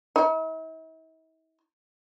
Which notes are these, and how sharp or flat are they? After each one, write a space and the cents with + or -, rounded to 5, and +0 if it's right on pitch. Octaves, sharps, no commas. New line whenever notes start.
E4 -45